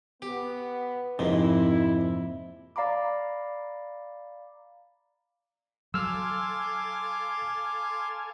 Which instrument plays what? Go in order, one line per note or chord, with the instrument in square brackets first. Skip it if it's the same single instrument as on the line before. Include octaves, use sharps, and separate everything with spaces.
[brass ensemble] B3 [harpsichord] G4
[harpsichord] A#1 G#2 C3 [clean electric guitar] F2 [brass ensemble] E4
[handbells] D5 F5 A#5 B5 D6
[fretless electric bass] F#3 [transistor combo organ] A4 F5 G#5 [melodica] C6 D6 [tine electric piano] E6 F6